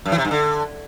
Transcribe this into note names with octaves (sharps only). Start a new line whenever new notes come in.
F#2
E3
C3
G2
D3